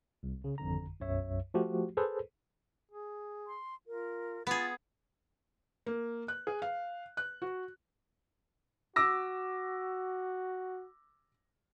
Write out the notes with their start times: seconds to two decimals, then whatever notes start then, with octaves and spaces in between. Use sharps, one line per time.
0.23 C2
0.44 C#3
0.58 G#1 F2 D3 A#5
1.00 B1 F#2 C#5 E5
1.54 F3 A3 F#4 G4
1.97 G#4 A4 B4 C5
2.92 G#4
3.47 C6
3.88 F4 A#4
4.47 B3 F4 G#4 A6
5.86 A#3
6.28 F#6
6.47 G#4
6.62 F5
7.17 F#6
7.42 F#4
8.96 F#4 D6 E6 A#6